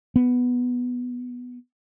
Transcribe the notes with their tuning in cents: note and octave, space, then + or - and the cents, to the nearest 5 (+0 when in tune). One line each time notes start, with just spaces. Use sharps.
B3 +0